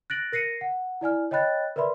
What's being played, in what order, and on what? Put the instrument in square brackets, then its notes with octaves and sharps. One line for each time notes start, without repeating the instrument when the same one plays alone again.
[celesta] F#6 A6 A#6 D7 F#7
A#4 A#6 C7 C#7 D#7
F#5
E4 D5 G#5 F6
C#5 D#5 G5 B5 F#6 A6
A#4 B4 D5 E5 B5 C6